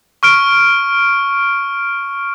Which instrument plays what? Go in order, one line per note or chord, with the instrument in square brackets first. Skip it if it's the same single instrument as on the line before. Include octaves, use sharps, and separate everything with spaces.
[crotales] C#6 F6 D7